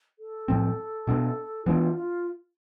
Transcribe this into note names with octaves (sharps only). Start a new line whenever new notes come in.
A4
A2 F3 C4
B2 B3 D4
E3 B3 D4 F4
F4